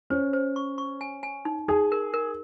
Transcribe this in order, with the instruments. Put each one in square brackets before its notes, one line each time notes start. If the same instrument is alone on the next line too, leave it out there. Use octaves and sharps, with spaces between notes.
[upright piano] C#4 [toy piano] C5
[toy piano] C5
C#6
C#6
G#5
G#5
D#4
[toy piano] D#4 [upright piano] G#4
[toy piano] A#4
A#4